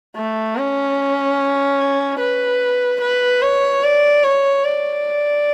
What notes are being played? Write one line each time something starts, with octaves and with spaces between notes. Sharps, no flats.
A3
C#4
B4
B4
C#5
D5
C#5
D5